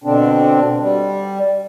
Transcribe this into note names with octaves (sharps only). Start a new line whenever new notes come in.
B2 D3 C4 D4
G3